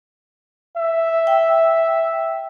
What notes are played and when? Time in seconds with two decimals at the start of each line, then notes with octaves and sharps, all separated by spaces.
0.77 E5
1.27 G5